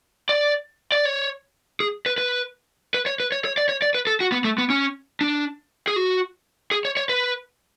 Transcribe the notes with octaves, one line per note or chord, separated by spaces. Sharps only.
D5
D5
C#5
G#4
B4
B4
B4
C#5
B4
C#5
C#5
D5
C#5
D5
B4
A4
F#4
B3
A3
B3
C#4
D4
G#4
F#4
G#4
C#5
C#5
B4